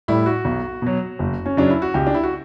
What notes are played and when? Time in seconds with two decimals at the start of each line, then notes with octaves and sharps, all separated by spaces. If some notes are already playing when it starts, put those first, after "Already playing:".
0.08 A2 G3 E4
0.26 F#4
0.45 B1
0.82 B2 F#3
1.19 F#1
1.46 C#4
1.57 F#2 C#3 F#3 D4
1.70 E4
1.82 F#4
1.94 C#2 G4
2.07 D4
2.14 E4
2.23 F#4